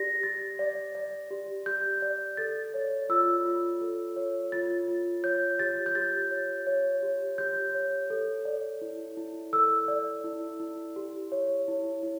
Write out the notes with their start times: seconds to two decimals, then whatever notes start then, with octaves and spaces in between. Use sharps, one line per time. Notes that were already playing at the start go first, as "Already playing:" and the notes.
Already playing: G4 D5 A#6
0.23 G4 A6
0.59 D5
0.95 D5
1.31 G4
1.66 G4 G6
2.02 D5
2.37 A4 A6
2.74 C#5
3.09 F4 E6
3.45 F4
3.81 A4
4.16 C#5
4.52 F4 A6
4.88 F4
5.24 C#5 G6
5.59 G4 A6
5.86 G6
5.95 G4 A6
6.31 C#5
6.67 C#5
7.03 G4
7.38 G4 G6
7.74 C#5
8.10 A4
8.45 D5
8.81 E4
9.17 E4
9.53 A4 E6
9.88 D5
10.24 E4
10.60 E4
10.96 G4
11.32 C#5
11.68 E4
12.03 E4